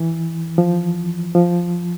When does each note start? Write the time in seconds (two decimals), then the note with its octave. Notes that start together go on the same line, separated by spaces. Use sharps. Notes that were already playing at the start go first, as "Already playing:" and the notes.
Already playing: E3
0.58 F3
1.35 F3